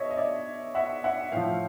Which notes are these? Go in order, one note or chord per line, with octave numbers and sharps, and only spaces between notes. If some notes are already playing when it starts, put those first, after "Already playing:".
Already playing: B2 C#5 D#5 E5
D#5
D5 E5
E5 F#5
E5 F#5
A2 F3 F5 G5